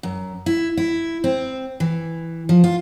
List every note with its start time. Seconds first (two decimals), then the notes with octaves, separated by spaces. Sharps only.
0.03 F#2
0.46 E4
0.77 E4
1.24 C4
1.80 E3
2.49 F3
2.64 F4